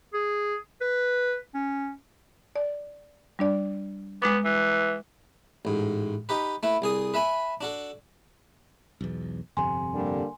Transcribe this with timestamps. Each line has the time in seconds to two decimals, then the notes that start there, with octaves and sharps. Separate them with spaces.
0.14 G#4
0.81 B4
1.54 C#4
2.56 D5
3.39 G3 D4 D5
4.22 G#3 B3 D6
4.45 E3
5.65 A1 G#2
6.29 D#4 G4 B4
6.63 A3 E4 B4
6.82 C2 G#4 D#6
7.14 B4 E5 G#5 B5
7.61 D4 F#4 A4
9.01 B1 E2
9.57 G1 F2 C3 G#5 C6
9.94 D3 G3 A#3